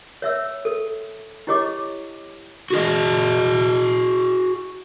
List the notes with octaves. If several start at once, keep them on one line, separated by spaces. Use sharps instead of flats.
C#5 E5 E6
A4
E4 G4 C#5 D#5 D6
F#4 G#4 D#5